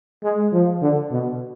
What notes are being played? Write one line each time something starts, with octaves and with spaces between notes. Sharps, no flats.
G#3
F3
D3
B2